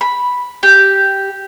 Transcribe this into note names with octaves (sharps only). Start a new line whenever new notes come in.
B5
G4